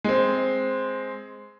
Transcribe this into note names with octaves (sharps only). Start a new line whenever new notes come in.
G#3 C4